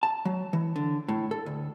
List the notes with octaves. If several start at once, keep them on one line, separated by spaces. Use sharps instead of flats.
A5
F#3
E3
D3
A2
A4
D2